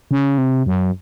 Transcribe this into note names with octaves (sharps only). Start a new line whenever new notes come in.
C#3
C3
F#2